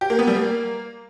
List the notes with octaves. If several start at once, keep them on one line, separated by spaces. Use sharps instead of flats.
G4
A#3
B3
G3
A#3